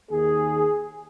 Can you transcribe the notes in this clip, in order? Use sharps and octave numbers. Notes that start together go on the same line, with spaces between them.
D#2 D#3 A#3 G#4